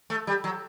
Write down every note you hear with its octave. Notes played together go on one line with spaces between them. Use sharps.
A3
G3
F#3